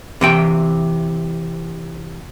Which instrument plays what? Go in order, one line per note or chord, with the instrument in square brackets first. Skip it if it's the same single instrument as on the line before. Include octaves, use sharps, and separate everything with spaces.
[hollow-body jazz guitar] C3 E3 G5